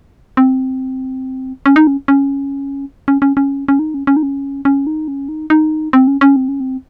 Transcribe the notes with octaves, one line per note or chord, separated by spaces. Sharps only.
C4
C#4
D#4
C#4
C#4
C#4
C#4
C#4
C#4
D#4
C#4
C#4
D#4
C#4
C#4
D#4
C#4
D#4
D#4
C4
C#4
C#4
C4
C#4
C4